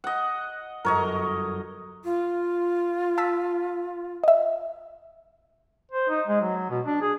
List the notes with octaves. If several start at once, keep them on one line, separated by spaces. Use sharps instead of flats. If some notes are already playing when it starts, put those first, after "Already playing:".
D#5 F#5
G1 F#2 A#4 C#5 D#5
F4
A5 E6 B6
D#5 E5
C5
D#4
G#3
F#3
B2
D4
G#4